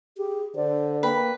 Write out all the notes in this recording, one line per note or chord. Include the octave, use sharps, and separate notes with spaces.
G4 G#4
D3 C5 D5
A#3 B4 G5